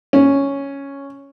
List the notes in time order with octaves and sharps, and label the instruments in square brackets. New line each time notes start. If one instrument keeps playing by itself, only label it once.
[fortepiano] C#4